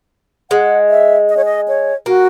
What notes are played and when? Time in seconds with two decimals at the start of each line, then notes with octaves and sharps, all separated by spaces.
0.51 G#3 F#5
0.89 E5
1.29 D#5
1.37 C#5
1.45 D#5
1.68 C#5
2.06 A#3 F#4